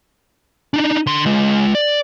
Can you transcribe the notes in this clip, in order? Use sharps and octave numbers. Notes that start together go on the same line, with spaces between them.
D4 D#4
D3 C6
G#3 F4
D5